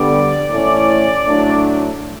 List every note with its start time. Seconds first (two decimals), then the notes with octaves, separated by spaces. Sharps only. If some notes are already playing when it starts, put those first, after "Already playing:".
Already playing: D3 G3 B3 D5
0.48 A2 E3 A3 C#4
1.27 A2 F#3 A3 D4